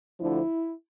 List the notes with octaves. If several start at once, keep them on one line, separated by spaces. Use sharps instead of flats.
D2 D3 F3 E4